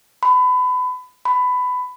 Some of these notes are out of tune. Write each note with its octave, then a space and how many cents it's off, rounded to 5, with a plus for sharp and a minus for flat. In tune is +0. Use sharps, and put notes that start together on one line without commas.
B5 +30
B5 +20